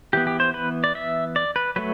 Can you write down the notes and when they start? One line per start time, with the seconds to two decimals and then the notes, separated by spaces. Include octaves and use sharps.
0.13 E3 B3 G4
0.27 G4
0.40 C5
0.54 B4
0.84 D5
0.95 E5
1.36 D5
1.56 B4
1.76 F#3 A3 B4